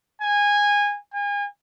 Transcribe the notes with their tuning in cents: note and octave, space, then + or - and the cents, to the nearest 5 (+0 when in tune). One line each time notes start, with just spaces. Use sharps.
G#5 -20
G#5 -35